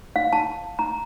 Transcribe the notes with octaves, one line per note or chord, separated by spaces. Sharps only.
F5
A5
A#5